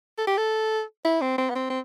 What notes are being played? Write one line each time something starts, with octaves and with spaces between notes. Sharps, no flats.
A4
G4
A4
E4
C4
C4
B3
C4
C4